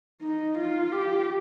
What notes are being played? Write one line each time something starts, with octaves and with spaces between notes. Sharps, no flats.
D#4
F4
G4